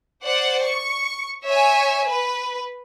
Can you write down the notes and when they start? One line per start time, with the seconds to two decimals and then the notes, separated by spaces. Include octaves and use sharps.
0.22 C5 D5 F#5
0.64 C#6
1.44 C#5 E5 G#5
2.06 B4